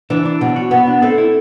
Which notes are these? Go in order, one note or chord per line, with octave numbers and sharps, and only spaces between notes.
E3 D4
D4
B2 F#3
F#4
B2 B3
D4
A3 C4
E4